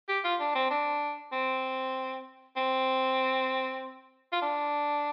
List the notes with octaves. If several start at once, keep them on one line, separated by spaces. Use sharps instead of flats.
G4
F4
D4
C4
D4
C4
C4
F4
D4